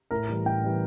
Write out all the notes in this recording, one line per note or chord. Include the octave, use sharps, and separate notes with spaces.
A2 A#4
E3 G3
A2 G5
E3 G3